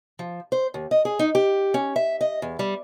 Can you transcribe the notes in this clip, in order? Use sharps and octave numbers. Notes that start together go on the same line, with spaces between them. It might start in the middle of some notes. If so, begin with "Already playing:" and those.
F3
C5
D#2
D#5
G#4
D#4
G4
C#4
E5
D#5
E2
G3